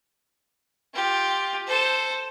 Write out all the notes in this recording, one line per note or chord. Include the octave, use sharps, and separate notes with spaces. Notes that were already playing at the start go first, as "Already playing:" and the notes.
F4 G4
A4 C5